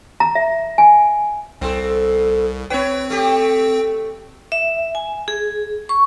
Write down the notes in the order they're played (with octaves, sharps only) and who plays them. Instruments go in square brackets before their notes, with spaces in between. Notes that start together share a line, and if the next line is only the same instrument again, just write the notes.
[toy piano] A#5
E5
G#5
[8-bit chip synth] C2 [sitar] C4 A4
[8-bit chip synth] C4 G5 [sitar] B4 C#5
[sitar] A3 G4
[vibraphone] E5
G#5
G#4
C#6